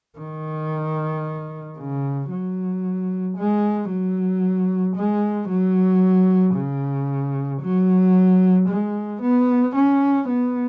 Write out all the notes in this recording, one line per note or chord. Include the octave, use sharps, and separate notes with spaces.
D#3
C#3
F#3
G#3
F#3
G#3
F#3
C#3
F#3
G#3
B3
C#4
B3